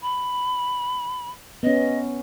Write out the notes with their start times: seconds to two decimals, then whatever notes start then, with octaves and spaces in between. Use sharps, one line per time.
0.02 B5
1.63 B3 C#4 D#5